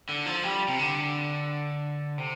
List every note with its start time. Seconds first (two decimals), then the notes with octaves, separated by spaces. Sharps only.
0.09 D3
0.26 F3
0.44 G3
0.68 C3
0.79 D3
2.18 C3